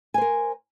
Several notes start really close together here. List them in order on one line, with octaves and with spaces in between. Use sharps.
G#5 C5 A#4